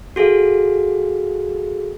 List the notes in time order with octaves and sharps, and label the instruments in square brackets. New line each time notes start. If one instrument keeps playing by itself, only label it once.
[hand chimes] F#4 G#4 A4 F5